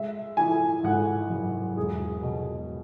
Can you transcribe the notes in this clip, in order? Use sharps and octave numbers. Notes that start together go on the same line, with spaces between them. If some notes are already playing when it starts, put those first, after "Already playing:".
Already playing: G#3 E5
E3 G#5
G#1 F#5
F#2
E1 G#4
B2